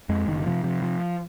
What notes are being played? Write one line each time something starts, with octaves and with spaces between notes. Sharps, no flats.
F2 G#3
F#1 D#3
D#3
C3 F3
C3 F3
F3